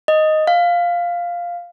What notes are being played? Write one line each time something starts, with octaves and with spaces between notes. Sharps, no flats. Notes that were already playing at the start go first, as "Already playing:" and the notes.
D#5
F5